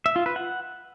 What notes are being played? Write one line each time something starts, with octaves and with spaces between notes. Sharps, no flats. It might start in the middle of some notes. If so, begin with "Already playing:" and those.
E5
F4
B4
F#5